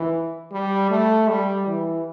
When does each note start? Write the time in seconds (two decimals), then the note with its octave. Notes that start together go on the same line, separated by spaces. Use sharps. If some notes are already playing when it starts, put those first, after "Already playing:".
Already playing: E3
0.52 G3
0.90 A3
1.28 G3
1.67 E3